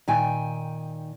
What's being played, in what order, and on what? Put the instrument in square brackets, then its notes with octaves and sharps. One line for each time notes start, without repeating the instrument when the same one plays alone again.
[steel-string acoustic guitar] A#2 D#3 G5 G#5